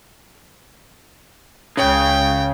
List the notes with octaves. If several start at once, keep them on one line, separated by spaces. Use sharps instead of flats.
C#2 C#3 G5